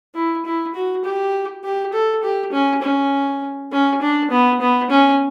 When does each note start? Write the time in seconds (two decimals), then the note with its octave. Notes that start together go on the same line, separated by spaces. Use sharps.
0.15 E4
0.45 E4
0.74 F#4
1.04 G4
1.64 G4
1.93 A4
2.23 G4
2.52 C#4
2.82 C#4
3.72 C#4
4.02 D4
4.31 B3
4.61 B3
4.91 C#4